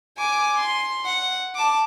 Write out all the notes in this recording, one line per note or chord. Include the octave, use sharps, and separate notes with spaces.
G#5 D6
C6
F#5
A5 D6